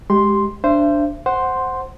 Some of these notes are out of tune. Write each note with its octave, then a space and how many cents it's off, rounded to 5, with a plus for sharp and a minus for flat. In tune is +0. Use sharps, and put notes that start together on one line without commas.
G#3 +0 G4 -5 C6 +0
D4 +0 C5 +0 E5 +35
C5 +0 F#5 +0 C6 +0